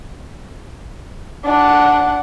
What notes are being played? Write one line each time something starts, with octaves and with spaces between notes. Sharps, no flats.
D4 F#5